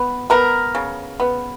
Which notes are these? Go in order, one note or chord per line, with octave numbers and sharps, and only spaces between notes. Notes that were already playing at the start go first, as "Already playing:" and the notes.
Already playing: B3
B3 A#4
C#3
B3